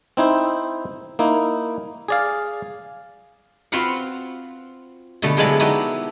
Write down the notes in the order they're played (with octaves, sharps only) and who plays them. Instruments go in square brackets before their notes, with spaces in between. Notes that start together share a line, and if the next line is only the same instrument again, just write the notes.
[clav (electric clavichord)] C4 D#4 E4 C5
A#3 D#4 E4
G#4 D5 F5
[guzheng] C4 F4 F#4 B4 F5 F#5
B2 D3 G3 A3
F3 F#3 G#3 B3 D4 E4
D#4 E4 F#4 G4 A4 B4